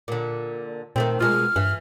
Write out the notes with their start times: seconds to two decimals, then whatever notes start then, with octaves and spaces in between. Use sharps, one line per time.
0.08 A#2 D3
0.96 A#2 D#3 A3 C4
1.20 B2 G#3 A#3 F4 F6
1.56 G2 E3